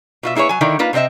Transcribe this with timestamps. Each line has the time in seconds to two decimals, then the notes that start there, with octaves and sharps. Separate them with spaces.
0.23 B2 F4 E5
0.35 A#3 E4 G#4 B4 C#5
0.49 F#3 G#5
0.61 D3 D#3 D#4 E4
0.79 A#3 D#4 F4 B4
0.93 C3 C4 D#4 D#5 E5